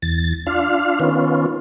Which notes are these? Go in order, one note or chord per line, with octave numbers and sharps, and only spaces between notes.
E2 A6
D4 F4 F5
D#3 B3 C#4 F4